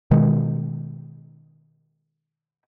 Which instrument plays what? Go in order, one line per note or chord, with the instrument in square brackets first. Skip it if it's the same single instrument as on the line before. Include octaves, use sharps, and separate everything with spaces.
[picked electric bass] B2 D#3 G#3